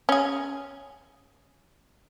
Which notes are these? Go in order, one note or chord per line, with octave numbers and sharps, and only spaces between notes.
C#4 G#4